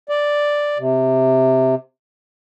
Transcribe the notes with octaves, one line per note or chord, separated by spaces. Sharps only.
D5
C3